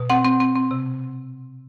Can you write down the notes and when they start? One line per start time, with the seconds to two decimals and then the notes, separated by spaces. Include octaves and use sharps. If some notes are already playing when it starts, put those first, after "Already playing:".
Already playing: B2
0.10 C4 F#5
0.24 C4
0.40 C4
0.55 C4
0.71 C3